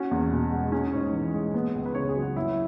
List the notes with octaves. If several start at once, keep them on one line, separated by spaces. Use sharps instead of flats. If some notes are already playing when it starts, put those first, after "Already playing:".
Already playing: C#4 F#4
E2
B2
G#3
C#4 G#4
G#2 C#5
E3
G#3
B3
C#2
B4
C#3 C#5
G#4
F#3
F#4
F#2 E4